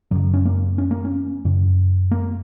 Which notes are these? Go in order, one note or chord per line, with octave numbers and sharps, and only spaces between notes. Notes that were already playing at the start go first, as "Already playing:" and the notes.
F#2 C#3 F#3
C#4
A#3
C#4
A#3
C#4
F#2 C#3
A#3